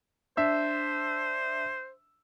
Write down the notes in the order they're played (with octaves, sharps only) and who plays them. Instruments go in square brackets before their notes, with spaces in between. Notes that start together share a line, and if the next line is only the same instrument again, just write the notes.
[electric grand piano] D4 E5 E6 [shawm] C5